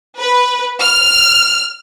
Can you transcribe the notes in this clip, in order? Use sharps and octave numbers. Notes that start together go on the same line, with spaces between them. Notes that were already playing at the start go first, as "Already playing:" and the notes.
B4
F6